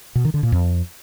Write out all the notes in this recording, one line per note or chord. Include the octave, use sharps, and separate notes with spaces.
B2
D#3
D3
A#2
F2